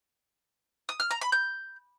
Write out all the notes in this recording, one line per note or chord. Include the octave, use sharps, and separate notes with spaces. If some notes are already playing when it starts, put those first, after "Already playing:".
D#6
F6
A#5
B5
G6